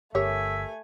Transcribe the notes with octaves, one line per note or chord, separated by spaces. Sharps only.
G1 A3 G4 A#4 C#5 E5 G#5